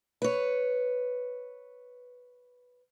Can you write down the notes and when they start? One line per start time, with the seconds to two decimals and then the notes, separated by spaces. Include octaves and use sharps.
0.22 B4 C#5